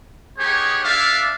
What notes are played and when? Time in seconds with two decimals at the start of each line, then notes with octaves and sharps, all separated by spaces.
0.39 B3 D#4 G4 G#4 C#5
0.85 D4 A4 D5 E5 F5